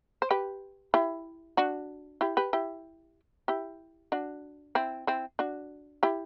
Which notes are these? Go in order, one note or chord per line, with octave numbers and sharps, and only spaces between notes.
C5
G4 B4
E4 G4
D4 F#4
E4 G4
G4 B4
E4 G4
E4 G4
D4 F#4
C4 E4
C4 E4
D4 F#4
E4 G4